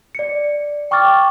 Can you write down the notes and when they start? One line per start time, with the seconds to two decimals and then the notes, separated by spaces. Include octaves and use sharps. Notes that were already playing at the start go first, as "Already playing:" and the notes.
0.15 D5 C#7
0.91 G5 C#6 D6 F6 A6